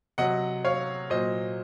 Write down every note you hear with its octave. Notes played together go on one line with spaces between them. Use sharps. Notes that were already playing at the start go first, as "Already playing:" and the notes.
C3 F#3 D#5 F#5
C#5 F5
A#2 F#3 C5 D#5